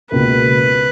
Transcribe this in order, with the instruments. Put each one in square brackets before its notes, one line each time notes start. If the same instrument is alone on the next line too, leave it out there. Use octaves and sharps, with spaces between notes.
[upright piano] C#2 B2 A#3 [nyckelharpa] B4